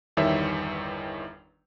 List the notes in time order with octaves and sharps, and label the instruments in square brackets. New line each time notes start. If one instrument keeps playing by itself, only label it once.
[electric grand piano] G1 E2 D#3 G3 C#5 E5